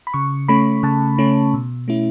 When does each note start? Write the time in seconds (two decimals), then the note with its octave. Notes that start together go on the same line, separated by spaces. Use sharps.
0.07 B5
0.14 C#3 C#6
0.48 A3 C#4 B5
0.83 C#3 A5
1.18 A3 C#4
1.54 B2
1.88 A3 C#4 E4